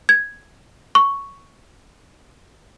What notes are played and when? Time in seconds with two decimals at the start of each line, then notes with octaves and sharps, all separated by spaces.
0.09 G#6
0.95 C#6